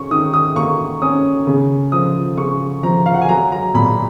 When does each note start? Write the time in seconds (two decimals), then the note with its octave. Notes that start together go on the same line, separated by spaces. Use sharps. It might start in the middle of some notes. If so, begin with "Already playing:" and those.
Already playing: C#4 C#6
0.11 D#3 D#6
0.34 D#6
0.55 A#3 C#6
1.02 C#4 D#6
1.47 C#3
1.92 F3 D#6
2.37 C#3 C#6
2.83 F3 A#5
3.06 F5
3.14 F#5
3.21 G#5
3.29 F#3 A#5
3.52 A#5
3.74 A#2 B5